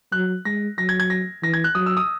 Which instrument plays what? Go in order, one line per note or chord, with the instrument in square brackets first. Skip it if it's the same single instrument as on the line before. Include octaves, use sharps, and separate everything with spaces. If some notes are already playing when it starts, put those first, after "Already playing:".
[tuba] F#3 [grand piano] F#6
[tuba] G#3 [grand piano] A#6
[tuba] F#3 [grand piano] A#6
[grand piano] G#6
G#6
A#6
[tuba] E3 [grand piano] A#6
[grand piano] G#6
F#6
[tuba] F#3 [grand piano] D#6
[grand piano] E6
D#6